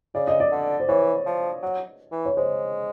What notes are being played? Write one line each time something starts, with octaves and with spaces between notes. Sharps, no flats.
C#3 D5
D#5
D5
D3
C5
E3 C#5
F3
F#3
E3
C#5
G#3 C5